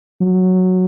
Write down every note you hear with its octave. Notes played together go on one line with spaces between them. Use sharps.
F#3